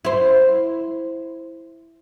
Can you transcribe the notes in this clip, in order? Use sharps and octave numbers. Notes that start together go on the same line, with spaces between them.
E4 C5